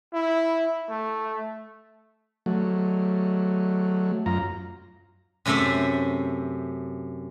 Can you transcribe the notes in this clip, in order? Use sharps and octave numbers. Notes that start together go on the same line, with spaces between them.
E4
A3
F#3 A3
F#2 F4 A#5
F#2 C3 A3 C5 E5